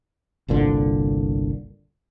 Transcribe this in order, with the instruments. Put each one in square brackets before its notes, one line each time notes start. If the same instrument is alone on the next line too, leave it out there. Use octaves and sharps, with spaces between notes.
[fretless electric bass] G1 C2 A#2 D3